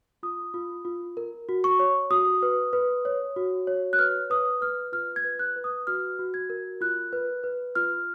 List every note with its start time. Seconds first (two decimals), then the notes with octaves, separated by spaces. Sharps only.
0.23 F4 D#6
0.54 F4
0.85 F4
1.17 A#4
1.49 F#4
1.64 C#6
1.79 C#5
2.11 F#4 D#6
2.43 B4
2.73 B4
3.05 C#5
3.36 F#4
3.67 C#5
3.93 F#6
3.99 B4 F6
4.30 B4 D#6
4.61 B4 F6
4.92 F4 F6
5.16 G#6
5.24 B4
5.39 F#6
5.56 B4
5.64 D#6
5.87 F#4 F6
6.19 F#4
6.34 G#6
6.50 A#4
6.81 F4 F#6
7.13 B4
7.44 B4
7.75 F4 F6